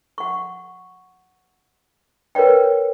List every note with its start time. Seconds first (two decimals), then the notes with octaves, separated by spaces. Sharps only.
0.18 F#5 C#6
2.35 A#4 B4 C#5 D5 G5